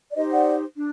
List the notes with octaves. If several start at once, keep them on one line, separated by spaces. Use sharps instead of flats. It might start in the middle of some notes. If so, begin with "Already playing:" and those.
D5
D#4 G4 C5 D#5
D5 F#5
D4